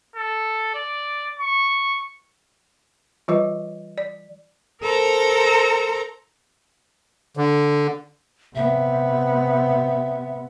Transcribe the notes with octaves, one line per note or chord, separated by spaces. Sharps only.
A4
D5
C#6
E3 G3 F4 B4 D#5
D5
A4 A#4 C5 A#5
D3
C3 B3 E5